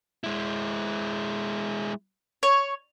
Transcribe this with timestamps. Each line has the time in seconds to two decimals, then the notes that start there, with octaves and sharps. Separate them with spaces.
0.24 G#3 E4
2.43 C#5